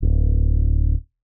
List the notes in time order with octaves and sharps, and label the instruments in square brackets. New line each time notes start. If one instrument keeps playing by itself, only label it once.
[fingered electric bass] D1